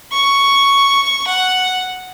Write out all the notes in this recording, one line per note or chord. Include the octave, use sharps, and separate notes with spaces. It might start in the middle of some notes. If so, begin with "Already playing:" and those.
C#6
F#5